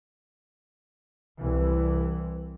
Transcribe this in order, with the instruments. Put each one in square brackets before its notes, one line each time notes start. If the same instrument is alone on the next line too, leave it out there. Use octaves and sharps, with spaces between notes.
[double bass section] C2 E3